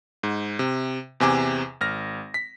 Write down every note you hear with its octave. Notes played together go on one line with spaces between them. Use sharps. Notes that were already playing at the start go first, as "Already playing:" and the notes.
G#2
C3
E2 C3 G#5 D6
G#1 F6 A#6
B6